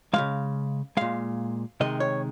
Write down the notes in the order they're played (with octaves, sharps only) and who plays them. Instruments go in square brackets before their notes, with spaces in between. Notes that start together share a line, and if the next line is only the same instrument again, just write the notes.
[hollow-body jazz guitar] C#3 F3 G#3 F5
A#2 G#3 F5
C3 D#3 G#3 D#5
C#5